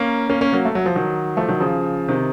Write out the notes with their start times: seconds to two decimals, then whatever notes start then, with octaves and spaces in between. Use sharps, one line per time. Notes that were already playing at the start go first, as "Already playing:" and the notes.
Already playing: A#3 C#4
0.29 A#3 C#4
0.41 A#3 C#4
0.53 F#3 A#3
0.65 A3
0.75 F#3
0.86 F3
0.95 D#3 F#3
1.37 F3 A3
1.49 D#3 F#3
1.60 C#3 F3
2.08 C3 D#3